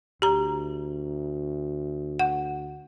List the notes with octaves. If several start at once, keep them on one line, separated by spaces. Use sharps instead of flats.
D2 G4 A#5
F#5